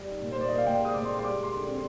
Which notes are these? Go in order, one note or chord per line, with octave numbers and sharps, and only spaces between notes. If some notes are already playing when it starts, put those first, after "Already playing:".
Already playing: G3
D#4
A#2
C5
A#2 D5
A#2 D#5
F5
A#2 G5
G#3 D#6
A#2 D6
G#3 C6
C6
G3 D6
G3
C6
D3
C4